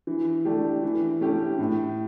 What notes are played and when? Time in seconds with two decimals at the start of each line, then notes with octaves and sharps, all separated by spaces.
0.07 E3
0.45 A3 D4 G4
0.83 E3
1.21 A3 C#4 G4
1.59 A2